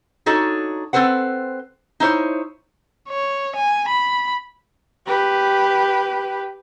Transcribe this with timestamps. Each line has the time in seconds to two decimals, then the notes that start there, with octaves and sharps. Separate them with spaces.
0.26 D4 D#4 F#4 A4 C#5
0.93 C4 A4 B4 C5 F#5
2.00 D#4 E4 C5 C#5
3.09 C#5
3.56 G#5
3.89 B5
5.06 G4 B4